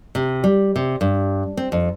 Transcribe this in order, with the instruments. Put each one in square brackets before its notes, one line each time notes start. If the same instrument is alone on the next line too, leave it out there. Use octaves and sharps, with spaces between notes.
[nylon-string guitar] C3
G3
C3
G2
C4
F2